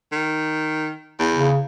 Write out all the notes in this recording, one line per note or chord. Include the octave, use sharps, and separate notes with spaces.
D#3
E2
C#3